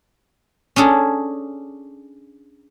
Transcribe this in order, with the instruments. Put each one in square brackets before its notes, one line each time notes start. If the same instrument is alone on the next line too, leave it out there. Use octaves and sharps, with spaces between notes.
[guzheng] C#4 D4 G#4 A4